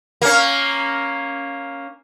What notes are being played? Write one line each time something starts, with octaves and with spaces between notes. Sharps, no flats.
A#3 C#4